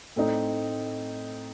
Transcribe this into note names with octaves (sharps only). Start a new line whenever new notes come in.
A2 A3 C4 D#4